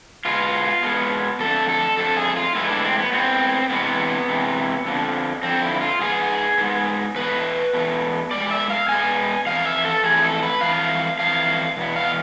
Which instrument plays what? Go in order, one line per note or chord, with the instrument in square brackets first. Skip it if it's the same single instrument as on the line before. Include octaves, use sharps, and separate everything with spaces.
[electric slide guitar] B2 G#3 B3 F4
B2 G#3 B3
F2 D3 A3 A4
A4
F2 D3 A3 A4
G#4
F4
A2 G#3 B3 E4
D4
C4
B3
A2 G#3 B3 C4
C3 E3 G#3 B3
C3 E3 G#3
F2 D3 F3
F2 D3 F3 C4
E4
F4
G#2 G#3 B3 G#4
G#2 G#3 B3
E2 B2 A3 B4
E2 B2 A3
B2 G#3 D5
E5
F5
B2 G#3 B3 G#5
F2 E3 A3 F5
E5
A4
F2 E3 A3 G#4
A4
B4
F2 E3 A3 F5
F2 E3 A3 F5
E2 B2 B3
F5